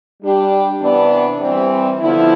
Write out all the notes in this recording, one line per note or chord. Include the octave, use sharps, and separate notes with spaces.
G3 D4 G4
C3 E3 B3 D4
E3 G3 C4
D3 F3 B3 E4